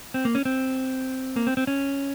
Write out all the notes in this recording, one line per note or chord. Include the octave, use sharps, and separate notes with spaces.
C4
A#3
C#4
C4
A#3
C4
C4
C#4